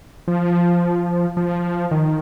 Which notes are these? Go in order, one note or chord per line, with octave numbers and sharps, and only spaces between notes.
F3
F3
D#3